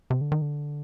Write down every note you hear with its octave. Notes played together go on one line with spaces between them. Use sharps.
C3
D3
D#3
D3